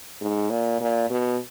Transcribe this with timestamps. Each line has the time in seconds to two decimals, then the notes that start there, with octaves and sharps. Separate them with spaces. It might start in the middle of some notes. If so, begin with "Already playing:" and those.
0.21 G#2
0.50 A#2
0.80 A#2
1.10 B2